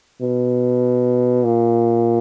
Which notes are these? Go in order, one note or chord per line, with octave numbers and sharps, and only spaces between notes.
B2
A#2